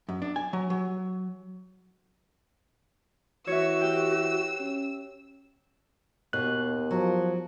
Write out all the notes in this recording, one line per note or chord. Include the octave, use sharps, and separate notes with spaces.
F#2
D4
G#5
F#3
F#3
E3 F#4 C#5 E5 E6
G4 G5
C#4
D#2 B2 F#6
F3 F#3